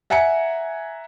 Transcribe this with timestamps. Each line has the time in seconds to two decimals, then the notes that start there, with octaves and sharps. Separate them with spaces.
0.10 E5 F#5 G#5 A#5 C#7